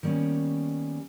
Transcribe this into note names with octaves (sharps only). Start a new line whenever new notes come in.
D#3 G3 A#3 B3 C#4